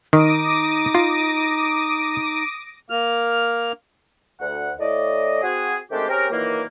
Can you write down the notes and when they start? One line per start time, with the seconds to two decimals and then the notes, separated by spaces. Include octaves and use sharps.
0.13 D#3 D#4 D6 D#6 A#6
0.95 F4
2.90 A#3 F6
4.40 D2 F#5
4.79 A2 D5 D#5
5.42 C4 F#4 G#4
5.91 D#3 G#3 A3 C4 D4 G4
6.08 C4 C#4 G4 G#4 A#4
6.31 A#2 D#3 E3 F#3 A#3